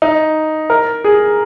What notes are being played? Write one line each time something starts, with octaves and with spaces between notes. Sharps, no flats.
D#4
A#4
G#4